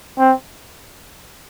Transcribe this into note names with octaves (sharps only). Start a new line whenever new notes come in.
C4